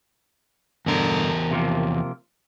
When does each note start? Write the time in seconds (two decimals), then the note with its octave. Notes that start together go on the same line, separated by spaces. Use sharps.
0.86 E2 G2 B2 D3 A#4
1.51 C3 F3 A#3